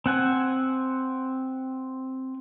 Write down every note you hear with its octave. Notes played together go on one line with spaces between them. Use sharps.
C4 F#5 G#5